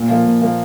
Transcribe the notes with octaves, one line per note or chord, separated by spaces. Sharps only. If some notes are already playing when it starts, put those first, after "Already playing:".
Already playing: A#2
F3 A#3
A#2
F3 A#3